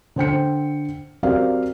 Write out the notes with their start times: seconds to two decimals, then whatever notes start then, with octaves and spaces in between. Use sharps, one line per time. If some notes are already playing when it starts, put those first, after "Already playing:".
0.16 D3 C5 G5 C#7
1.23 F#3 C4 G4 A#4 D5 F5